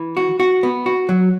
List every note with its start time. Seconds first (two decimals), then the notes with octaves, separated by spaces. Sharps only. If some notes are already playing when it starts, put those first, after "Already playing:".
Already playing: E3
0.17 F#4
0.40 F#4
0.63 B3
0.86 F#4
1.09 F#3